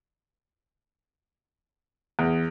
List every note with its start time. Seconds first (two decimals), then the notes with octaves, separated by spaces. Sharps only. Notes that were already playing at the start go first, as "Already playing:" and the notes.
2.19 E2